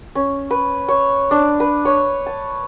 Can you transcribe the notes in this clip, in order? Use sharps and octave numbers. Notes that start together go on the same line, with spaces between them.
C#4
B4
C#5
D4
B4
C#5
A5